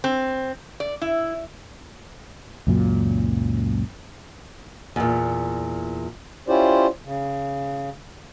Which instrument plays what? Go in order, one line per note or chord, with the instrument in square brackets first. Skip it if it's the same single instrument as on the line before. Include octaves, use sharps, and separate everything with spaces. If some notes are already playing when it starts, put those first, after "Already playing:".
[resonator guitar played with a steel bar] C4
D5
E4
[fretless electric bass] C#2 F#2 A#2 F#3
[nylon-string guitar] E2 A#2
[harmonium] C#4 E4 F4 G4 C5 D5
C#3